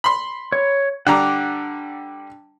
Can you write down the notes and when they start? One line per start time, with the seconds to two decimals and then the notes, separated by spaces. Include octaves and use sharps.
0.04 B5 C6
0.52 C#5
1.07 D3 G3 F#5 A#5 D6